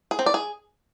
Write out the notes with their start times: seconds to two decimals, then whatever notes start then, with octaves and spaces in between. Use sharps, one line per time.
0.11 G#4
0.19 C4
0.26 D5
0.34 G#4